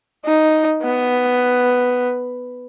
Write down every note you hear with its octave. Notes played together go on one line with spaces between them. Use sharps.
D#4
B3